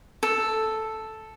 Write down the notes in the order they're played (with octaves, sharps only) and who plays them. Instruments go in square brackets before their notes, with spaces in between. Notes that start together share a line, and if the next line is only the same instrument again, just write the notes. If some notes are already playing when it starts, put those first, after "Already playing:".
[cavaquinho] A4